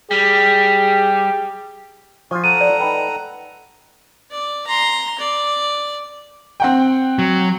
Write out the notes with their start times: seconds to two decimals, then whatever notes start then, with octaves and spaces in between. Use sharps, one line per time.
0.11 G3 G4 G#4
2.31 F3 F4 G#5 C#6
2.44 A4 F#5 A#5 D#7
2.61 D5
2.80 D#4 B4 G5
4.31 D5
4.67 A#5 C6
5.19 D5
6.60 C4 F#5 G5
7.19 F#3